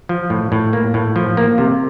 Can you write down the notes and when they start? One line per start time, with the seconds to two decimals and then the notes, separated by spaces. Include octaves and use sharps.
0.09 F3
0.30 A2
0.52 A2
0.73 A#3
0.94 A2
1.16 F3
1.37 A#3
1.58 C3